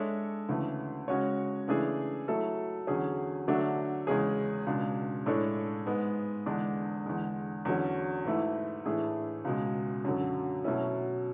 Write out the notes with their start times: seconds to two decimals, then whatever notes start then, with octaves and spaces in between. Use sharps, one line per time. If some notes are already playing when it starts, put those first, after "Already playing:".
Already playing: G#3 D4 A4 C#5 E5
0.49 D2 C#3 E3 A3
1.08 C#3 G#3 C#4 F#4 C#5
1.68 C#3 E3 A3 D4 G#4
2.28 F#3 A3 E4 A4
2.87 E2 D3 F#3 C#4 G#4
3.48 D3 F#3 A3 D4 F#4
4.07 E2 C#3 G#3 C#4 G#4
4.67 C#2 B2 G#3 D4
5.26 A2 G#3 D4 A4 C#5
5.86 G#2 G#3 B3
6.46 E2 D3 G#3 D4
7.06 E2 D3 G#3
7.65 E2 D3 F#3 C#4
8.25 G#2 E3 A3 E4
8.85 A2 E3 A3 D4 G#4
9.45 C#2 B2 G#3
10.05 F#2 D3 F#3
10.64 B2 F#3 A3 C#4 E4